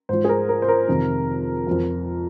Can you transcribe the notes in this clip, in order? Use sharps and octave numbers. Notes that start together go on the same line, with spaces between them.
G#2 F3 C5
G#4
A#4
A#4
C5
A#4
F2 C3 D#3
F2 F3